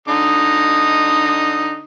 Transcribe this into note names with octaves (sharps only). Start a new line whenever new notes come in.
D3 D#4 D#6